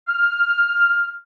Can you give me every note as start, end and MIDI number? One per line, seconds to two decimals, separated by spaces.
0.08 1.15 89